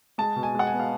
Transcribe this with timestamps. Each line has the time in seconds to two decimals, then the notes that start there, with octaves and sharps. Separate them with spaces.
0.18 G#3 A5
0.36 B2
0.43 G#5
0.55 G#3 F#5
0.67 G#5
0.73 B3
0.80 F5